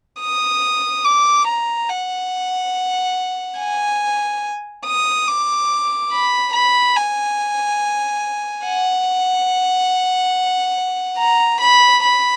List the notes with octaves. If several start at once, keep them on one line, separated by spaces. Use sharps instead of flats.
D#6
D6
A#5
F#5
G#5
D#6
D6
B5
B5
G#5
F#5
A#5
B5
B5